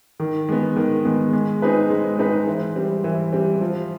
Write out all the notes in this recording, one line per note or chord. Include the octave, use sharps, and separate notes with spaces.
D#3
G#3 B3
D#3
G#3 B3
G#3
C4 D#4 G#4 B4
G#3
C4 D#4 G#4 B4
E3
G3 C4
E3
G3 C4
F3